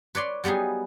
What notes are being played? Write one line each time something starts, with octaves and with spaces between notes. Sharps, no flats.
B4 C#5 D5 C6
F#3 G3 B3 D#4 G#4